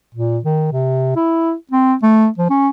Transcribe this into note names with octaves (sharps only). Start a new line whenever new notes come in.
A#2
D#3
C3
E4
C4
A3
F3
C#4